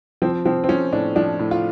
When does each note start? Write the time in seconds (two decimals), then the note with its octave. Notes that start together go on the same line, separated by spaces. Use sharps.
0.22 F3 C4
0.46 F3 C4
0.64 C4
0.69 F3 C#4
0.92 A2 D4
1.16 F3 D4
1.39 A2
1.51 F4